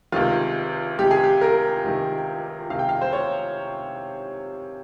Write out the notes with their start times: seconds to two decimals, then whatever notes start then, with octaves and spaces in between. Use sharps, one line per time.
0.12 C#2 C3 D#3 F4
0.99 C#2 C3 D#3 G4
1.11 G#4
1.24 G4
1.41 A#4
1.84 C#2 C3 D#3
2.70 C#2 C3 D#3 F5
2.79 G5
2.89 F5
3.01 C5
3.13 C#5